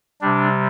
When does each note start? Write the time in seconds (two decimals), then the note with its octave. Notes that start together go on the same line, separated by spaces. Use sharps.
0.21 C3 G3 D4